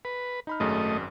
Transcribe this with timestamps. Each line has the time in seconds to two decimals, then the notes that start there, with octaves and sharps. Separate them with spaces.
0.05 B4
0.47 D#4 B5 F6
0.60 G#1 F#2 A3 G#4 D#5